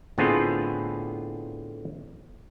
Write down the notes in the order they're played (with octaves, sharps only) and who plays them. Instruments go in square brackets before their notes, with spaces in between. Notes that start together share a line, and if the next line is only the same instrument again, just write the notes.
[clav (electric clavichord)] A2 D3 B3 C4 F4 G#4